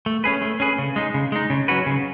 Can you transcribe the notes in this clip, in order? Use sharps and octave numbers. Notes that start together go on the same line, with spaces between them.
A3
C#4 G#4 B4
A3
C#4 G#4 B4
C#3
G#3 D#4
C#3
G#3 D#4
C#3
F#3 C#4 F#4 B4
C#3